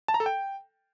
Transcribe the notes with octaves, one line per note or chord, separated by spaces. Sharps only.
A5
A#5
A4
G5